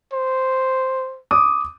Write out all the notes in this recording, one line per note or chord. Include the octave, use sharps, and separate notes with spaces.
C5
D6 D#6